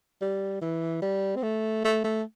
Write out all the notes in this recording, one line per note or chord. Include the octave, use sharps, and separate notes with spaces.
G3
E3
G3
C4
A3
A3
A3